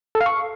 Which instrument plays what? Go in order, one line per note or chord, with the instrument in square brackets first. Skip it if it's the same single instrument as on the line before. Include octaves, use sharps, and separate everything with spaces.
[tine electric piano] A4
F5
C#6